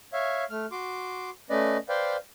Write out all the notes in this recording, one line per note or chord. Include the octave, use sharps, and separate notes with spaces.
C#5 E5 F5
A3 F6
F#4 C6 D6
A3 C#4 B4 D5 D#5
B4 C5 D5 F5 G5